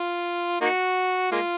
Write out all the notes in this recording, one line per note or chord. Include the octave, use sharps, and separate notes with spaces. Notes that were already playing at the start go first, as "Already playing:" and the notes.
Already playing: F4
A#3 D#4 F#4
G#3 A#3 F4